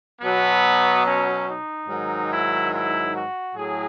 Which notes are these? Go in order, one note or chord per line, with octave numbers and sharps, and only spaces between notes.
B2 F#3 B3
C#4
D#4
G#2 D#3 F#3
E4
E4
F#4
A2 F#3 G#4